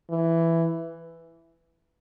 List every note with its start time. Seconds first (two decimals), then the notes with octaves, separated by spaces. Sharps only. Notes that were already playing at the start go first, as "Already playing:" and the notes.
0.10 E3